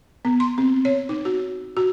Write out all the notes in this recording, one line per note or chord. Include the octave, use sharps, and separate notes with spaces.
B3
C6
C4
C#5
D#4
F#4
F#4